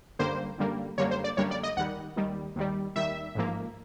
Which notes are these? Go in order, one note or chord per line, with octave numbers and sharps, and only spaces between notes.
F#2 D3 G3 A#3 C5
F#2 D3 G3 A#3
F#2 D3 G3 A#3 C#5
C5
D5
F#2 D3 G3 A#3 C#5
D5
D#5
D#2 D#3 G3 F#5
D#2 D#3 G3
D#2 D#3 G3
D#2 D#3 G3 E5
A1 G#2 F3 A#3